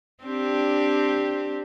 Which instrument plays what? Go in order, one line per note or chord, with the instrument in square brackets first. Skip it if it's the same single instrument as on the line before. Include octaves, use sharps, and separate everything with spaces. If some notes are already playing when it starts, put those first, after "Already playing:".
[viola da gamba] C4 D4 G4